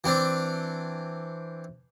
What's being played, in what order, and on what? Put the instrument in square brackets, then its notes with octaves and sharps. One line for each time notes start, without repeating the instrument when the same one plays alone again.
[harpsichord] E3 C4 D4